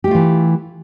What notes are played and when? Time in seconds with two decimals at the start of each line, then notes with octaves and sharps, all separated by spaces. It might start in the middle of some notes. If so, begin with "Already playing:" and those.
0.04 G4
0.08 A3
0.11 F4
0.15 E3